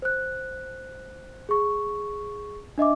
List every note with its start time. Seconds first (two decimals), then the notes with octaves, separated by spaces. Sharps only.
0.02 C5 F#6
1.49 G#4 C#6
2.78 D4 D#5 E5 D6